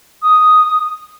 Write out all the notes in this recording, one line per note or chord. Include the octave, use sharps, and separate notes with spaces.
D#6